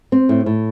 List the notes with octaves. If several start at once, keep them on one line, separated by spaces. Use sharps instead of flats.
C4
A2
A2